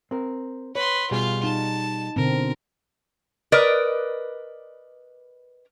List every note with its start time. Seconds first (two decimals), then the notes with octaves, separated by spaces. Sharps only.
0.11 C4 A#4
0.75 B4 C#5 C6
1.11 B2 G3 F4 G#4 F5
1.44 D#4 A5
2.16 B2 D3 C4 A#4
3.52 A#4 B4 D5 D#5